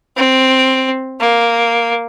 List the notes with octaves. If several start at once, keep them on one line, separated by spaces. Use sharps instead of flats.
C4
A#3